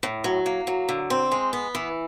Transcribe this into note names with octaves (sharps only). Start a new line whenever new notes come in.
A2
F#3
A#3
F#3
D3
C4
G#3
B3
E3